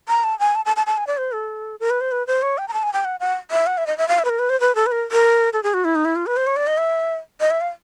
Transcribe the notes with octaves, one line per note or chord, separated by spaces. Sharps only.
A#5
A5
G#5
A5
A5
A5
A5
G#5
D5
C5
A4
A#4
B4
C5
B4
C5
C#5
G5
A#5
A5
G#5
G5
F#5
F#5
E5
F#5
E5
D#5
E5
F5
E5
B4
A#4
B4
C5
B4
A4
B4
A#4
A#4
A4
G#4
F#4
E4
D#4
E4
F4
B4
C5
C#5
D5
D#5
E5
D#5
E5
F5